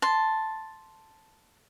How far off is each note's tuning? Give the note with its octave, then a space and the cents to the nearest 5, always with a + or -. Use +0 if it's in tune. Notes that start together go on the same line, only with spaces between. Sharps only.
A5 +0 C6 +0